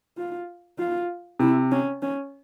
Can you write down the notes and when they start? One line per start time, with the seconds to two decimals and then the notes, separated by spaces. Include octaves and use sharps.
0.17 F4
0.78 F4
1.39 C3 E4
1.71 C#4
2.02 C#4